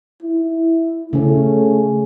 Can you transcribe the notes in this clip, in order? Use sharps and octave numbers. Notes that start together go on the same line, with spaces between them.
E4
C#3 A3 C#4